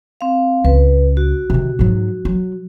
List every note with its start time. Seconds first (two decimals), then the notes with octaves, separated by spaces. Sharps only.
0.21 C4 F5
0.65 C#2 B4
1.17 F#4
1.50 C3 D#3
1.79 G#2 F#3
2.25 F#3